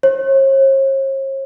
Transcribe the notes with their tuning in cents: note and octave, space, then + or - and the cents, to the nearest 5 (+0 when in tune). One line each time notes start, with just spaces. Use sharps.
C#5 -45